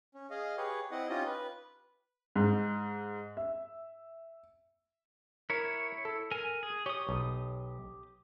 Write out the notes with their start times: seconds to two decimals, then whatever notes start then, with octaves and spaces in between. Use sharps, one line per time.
0.15 C#4
0.30 G#4 D#5 F5
0.57 G4 G#4 B4 C#5
0.91 C4 E4 D#5 F#5
1.09 C#4 D#4 F4 G4 D#5
1.26 B4
2.36 G#2
3.37 E5
5.50 E4 A#4 C#5
6.05 A4
6.31 A#4 G#5
6.63 G#4
6.86 G4 C#5 D#6
7.09 B1